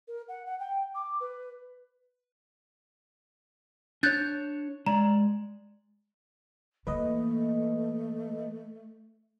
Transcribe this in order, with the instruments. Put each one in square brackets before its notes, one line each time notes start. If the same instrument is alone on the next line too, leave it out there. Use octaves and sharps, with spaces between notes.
[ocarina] A#4
F#5
F#5
G5
D6
B4
[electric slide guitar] D4 C#5 [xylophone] F#6 G6 A6
[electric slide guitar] G#3 D5 [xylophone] A#5
[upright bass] E3 A#3 [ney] A3 [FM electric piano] B4 D#5